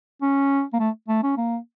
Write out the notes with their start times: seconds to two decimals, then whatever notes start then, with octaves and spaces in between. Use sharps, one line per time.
0.22 C#4
0.73 A#3
0.79 A3
1.08 A3
1.23 C#4
1.37 A#3